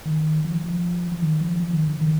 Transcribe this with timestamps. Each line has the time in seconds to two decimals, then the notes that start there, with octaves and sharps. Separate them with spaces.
0.05 D#3
0.45 F3
0.64 F3
1.12 F3
1.22 D#3
1.41 F3
1.60 F3
1.73 D#3
1.87 D3
2.01 D#3